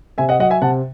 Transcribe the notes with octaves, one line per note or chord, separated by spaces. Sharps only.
C3 E5 G#5
D#5 F#5
F#3 D#5 F#5
E5 G#5
C3 F#5 A5